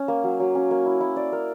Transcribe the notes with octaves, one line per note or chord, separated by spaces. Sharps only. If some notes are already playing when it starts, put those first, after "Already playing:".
Already playing: C#4
A#3
F#3
F#3
C#4
A#3
E4
E4
D5
A#4